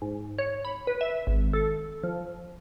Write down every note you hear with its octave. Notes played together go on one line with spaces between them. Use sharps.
G#2
C#5
B5
B4
E5
G#1
A4
F3